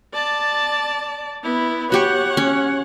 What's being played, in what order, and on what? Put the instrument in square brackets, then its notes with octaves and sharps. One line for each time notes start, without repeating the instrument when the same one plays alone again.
[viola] D5 A5
B3 E4
[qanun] F#4 G4 C#6 [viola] C#5 F#5
[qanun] C#4